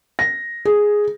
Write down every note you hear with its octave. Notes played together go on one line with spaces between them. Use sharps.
A#6
G#4